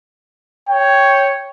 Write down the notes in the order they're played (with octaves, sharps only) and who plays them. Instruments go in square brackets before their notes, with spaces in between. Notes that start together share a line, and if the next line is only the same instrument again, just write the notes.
[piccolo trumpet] C#5 [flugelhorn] G5